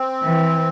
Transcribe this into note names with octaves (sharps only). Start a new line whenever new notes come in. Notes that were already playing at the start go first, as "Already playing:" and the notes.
Already playing: C4
E3